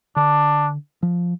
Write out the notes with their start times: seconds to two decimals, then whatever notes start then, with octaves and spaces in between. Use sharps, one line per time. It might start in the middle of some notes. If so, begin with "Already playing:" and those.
0.16 D3 D4
1.03 F3